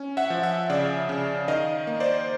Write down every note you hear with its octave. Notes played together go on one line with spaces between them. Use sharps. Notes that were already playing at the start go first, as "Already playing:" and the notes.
Already playing: C#4
E5 F#5
F3
E5 F#5
C#3 D5 E5
C#3
D#3 D#5 F5
A#3
C5 D5